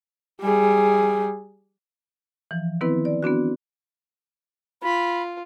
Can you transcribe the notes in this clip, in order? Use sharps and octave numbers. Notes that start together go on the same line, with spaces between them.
G3 G#4
E3 F3
D#3 B3 C4 E4 B4
D5
B3 C4 D4 F#4
F4 B5